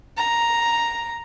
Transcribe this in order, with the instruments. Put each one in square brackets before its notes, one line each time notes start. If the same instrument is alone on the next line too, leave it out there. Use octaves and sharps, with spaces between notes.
[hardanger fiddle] A#5